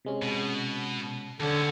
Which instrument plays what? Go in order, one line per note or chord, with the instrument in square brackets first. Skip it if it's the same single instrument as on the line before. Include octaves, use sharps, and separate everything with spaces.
[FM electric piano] C3 G#3 C#4
[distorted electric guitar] B2
[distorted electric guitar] D#2 C#4 [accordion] D3 [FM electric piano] A4